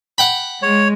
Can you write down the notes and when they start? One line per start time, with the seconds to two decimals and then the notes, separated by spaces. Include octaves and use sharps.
0.18 F#5 G5 B5
0.63 G#3 C#5